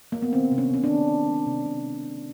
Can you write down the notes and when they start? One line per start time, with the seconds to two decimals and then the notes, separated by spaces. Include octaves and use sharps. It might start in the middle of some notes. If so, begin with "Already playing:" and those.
0.12 A#3
0.22 B3
0.32 D#3 C4
0.52 C3
0.58 C#4
0.70 C3 C#4
0.84 D4
0.89 D#3
1.09 C3
1.27 G#3
1.46 C3
1.66 C3